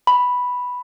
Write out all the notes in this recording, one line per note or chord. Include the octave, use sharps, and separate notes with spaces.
B5